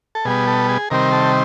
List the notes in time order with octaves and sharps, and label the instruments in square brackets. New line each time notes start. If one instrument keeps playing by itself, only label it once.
[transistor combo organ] A4
B2 G3 B3 G#4
A4
G#4
C3 D#3 G3 C4 A#4
A4